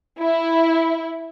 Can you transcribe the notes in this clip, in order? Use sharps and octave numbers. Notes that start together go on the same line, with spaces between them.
E4